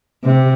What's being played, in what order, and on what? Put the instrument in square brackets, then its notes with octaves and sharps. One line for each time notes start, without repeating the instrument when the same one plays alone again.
[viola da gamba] C3